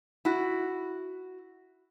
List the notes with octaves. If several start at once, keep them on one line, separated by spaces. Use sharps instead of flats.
E4 F#4